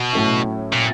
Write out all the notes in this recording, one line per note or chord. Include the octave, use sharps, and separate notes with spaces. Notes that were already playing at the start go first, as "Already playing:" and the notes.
Already playing: B2
A2 F#3 A3 C#4 E4
A#2